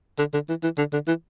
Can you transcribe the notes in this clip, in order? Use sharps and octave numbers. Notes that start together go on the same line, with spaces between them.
D3
D3
E3
E3
D3
D3
E3